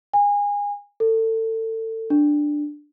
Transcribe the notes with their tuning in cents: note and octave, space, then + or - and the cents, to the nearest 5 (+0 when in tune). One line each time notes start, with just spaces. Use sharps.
G#5 -30
A4 +30
D4 +5